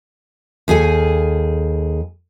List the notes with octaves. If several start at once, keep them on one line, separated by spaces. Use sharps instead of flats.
D#2 G#4 A4 G#5